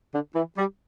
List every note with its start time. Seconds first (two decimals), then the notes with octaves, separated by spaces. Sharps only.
0.13 D3
0.35 E3
0.57 G3